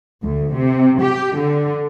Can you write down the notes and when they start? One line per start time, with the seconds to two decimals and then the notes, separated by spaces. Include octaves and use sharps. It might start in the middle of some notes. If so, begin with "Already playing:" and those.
0.25 D2
0.54 C3
1.02 G4
1.38 D3